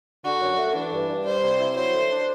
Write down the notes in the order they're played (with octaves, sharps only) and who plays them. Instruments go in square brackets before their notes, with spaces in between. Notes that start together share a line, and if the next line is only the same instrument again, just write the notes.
[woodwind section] D3 [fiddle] F#4
[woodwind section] F#2
A3
[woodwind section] E3 [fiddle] D4
[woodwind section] G2
G2
[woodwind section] G3 [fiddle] C5
[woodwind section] C3
E4
[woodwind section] F#3 [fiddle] C5
[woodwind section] D3
D4